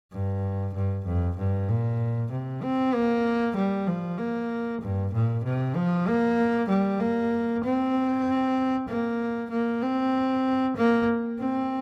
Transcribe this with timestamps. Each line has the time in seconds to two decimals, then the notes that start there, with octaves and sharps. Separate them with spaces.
0.12 G2
0.74 G2
1.05 F2
1.38 G2
1.69 A#2
2.31 C3
2.62 C4
2.94 A#3
3.56 G3
3.87 F3
4.18 A#3
4.81 G2
5.13 A#2
5.44 C3
5.75 F3
6.07 A#3
6.69 G3
7.00 A#3
7.64 C4
8.88 A#3
9.50 A#3
9.82 C4
10.76 A#3
11.39 C4